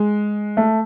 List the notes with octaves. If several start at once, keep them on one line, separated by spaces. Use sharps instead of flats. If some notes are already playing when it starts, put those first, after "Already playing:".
Already playing: G#3
A3